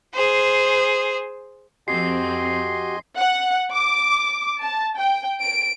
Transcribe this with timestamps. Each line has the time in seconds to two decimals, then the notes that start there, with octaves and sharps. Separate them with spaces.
0.14 G#4 C5
1.88 F2 C4 F#4 G4 D#5 G#5 C6 C7
3.17 F#5
3.73 D6
4.62 A5
4.98 G5
5.41 D7